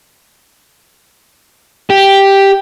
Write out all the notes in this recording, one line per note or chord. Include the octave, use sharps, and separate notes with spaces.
G4